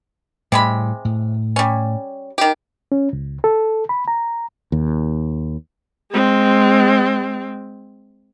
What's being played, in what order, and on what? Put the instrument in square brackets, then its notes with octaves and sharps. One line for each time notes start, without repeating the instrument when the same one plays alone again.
[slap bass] A2 G3 [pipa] C3 G#3 B5
[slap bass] A2
[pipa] G3 C#4
D#3 G4
[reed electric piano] C#4
C#2
A4
B5
A#5
[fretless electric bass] D#2
[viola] G#3 C4